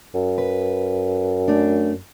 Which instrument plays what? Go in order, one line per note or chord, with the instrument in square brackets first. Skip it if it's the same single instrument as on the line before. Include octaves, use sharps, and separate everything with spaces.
[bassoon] F#2
[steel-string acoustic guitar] B4
A3 D4